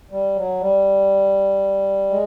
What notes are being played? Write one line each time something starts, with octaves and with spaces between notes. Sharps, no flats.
G3
F#3
G3
G#3